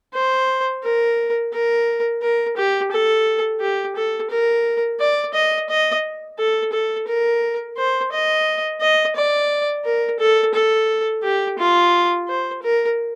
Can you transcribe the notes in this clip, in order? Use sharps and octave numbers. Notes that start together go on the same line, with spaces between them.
C5
A#4
A#4
A#4
G4
A4
G4
A4
A#4
D5
D#5
D#5
A4
A4
A#4
C5
D#5
D#5
D5
A#4
A4
A4
G4
F4
C5
A#4